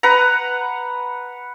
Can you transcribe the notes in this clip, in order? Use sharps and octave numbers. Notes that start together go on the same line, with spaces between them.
B4 F#5 A#5